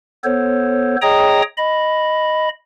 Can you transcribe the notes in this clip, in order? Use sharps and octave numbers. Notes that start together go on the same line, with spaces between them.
B3 A4 C5 C#5
G#4 C#5 D#5 G5 A#5 D#6
D#5 B5